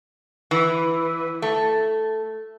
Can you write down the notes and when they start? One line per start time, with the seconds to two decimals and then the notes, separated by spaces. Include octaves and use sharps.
0.51 E3
1.42 A3